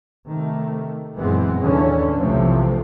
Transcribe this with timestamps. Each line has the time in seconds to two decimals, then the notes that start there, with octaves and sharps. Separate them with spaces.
0.29 C3 D#3 A3
1.16 F#2 A#2 E3 G#3 B3 C4
1.59 D#2 A2 D3 E3 C#4
2.19 B1 C3 E3 F3 A3 C4